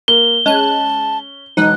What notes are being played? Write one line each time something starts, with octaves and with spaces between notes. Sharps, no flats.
A#3 G7
G#3 C#4 A5 F#6
E1 D#4 F#6